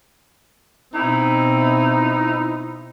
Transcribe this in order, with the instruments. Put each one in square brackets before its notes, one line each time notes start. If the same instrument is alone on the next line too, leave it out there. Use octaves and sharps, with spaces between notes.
[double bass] B2 C4 [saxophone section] D#4 E4